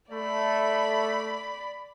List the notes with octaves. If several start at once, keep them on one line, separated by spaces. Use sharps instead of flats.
A3 D5 B5